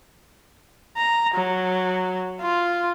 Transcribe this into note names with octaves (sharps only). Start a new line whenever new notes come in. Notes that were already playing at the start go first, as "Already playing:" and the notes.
A#5
F#3
F4